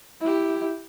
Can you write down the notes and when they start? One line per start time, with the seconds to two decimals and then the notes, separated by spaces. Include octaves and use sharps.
0.20 E4 G4